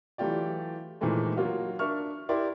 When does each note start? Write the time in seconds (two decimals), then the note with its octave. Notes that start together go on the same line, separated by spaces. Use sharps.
0.18 E3 F#3 A3 F4 G4 D5
1.01 A#2 D#3 E3 G#3 A3 C4
1.37 F#3 A#3 F4 F#4
1.79 D4 A#4 E5 C#6 F6
2.29 E4 G4 A#4 D5 C6